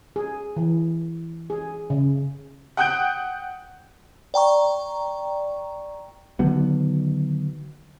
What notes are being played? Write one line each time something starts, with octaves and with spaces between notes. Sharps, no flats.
G#4
E3
G#4
C#3
F#5 G5 D#6 F#6 G6 D7
D5 G5 A#5 C#6
D3 D#3 F#3 B3